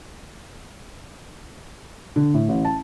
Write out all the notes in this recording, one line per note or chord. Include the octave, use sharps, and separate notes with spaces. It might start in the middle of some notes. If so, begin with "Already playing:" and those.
D3
A2
A1
A5